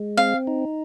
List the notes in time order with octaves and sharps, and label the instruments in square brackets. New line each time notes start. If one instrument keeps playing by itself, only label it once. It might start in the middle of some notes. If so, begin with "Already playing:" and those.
Already playing: [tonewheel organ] G#3
[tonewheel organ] C4 [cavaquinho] F5
[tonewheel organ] D#4